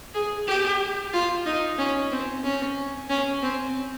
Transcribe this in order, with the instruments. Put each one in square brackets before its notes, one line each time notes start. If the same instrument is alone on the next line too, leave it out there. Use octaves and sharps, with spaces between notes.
[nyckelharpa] G#4
G4
F4
D#4
C#4
C4
C#4
C#4
C4